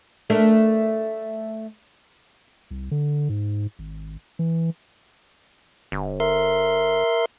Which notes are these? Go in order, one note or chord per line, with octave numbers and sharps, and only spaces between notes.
A3 D4 A#4
C2
D3
G#2
G#1
E3
G1
A#4 E5 C6